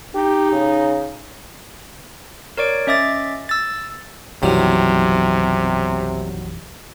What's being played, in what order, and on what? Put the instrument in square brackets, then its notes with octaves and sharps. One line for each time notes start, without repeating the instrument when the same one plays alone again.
[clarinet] D#4 [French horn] G4
[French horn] C#3
[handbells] A#4 C#5 D5 D7
C#4 D#5 E5 D6 A6
E6 A6
[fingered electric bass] B1 F#2 E3 [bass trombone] C3 [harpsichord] D#3 F#3 G3